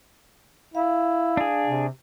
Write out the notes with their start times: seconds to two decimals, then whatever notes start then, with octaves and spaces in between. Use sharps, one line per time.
0.75 E4 F5
1.37 D4 G#4
1.67 C3